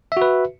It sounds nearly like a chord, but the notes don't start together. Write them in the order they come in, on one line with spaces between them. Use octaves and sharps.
E5 F#4 B4